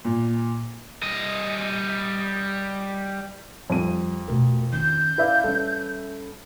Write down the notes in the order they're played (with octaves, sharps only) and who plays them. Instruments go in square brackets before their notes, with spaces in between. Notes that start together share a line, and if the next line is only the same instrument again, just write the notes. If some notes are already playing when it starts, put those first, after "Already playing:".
[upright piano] A#2
[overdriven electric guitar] G3 D#5
[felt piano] F2 D#7 [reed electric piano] F3 G3
[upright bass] B2 A3 [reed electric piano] A#4
[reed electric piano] D#3 [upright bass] C4 C#4 [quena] G6
[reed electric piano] E4 D5 F5 [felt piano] B4 E5
[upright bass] G3 [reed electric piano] C#4 A4